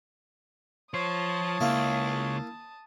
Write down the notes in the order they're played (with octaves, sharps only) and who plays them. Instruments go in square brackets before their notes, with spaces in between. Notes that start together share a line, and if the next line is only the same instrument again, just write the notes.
[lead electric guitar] F3 C5 [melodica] C#5 [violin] A5 D#6
[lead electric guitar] C#2 [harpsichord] A#3 E4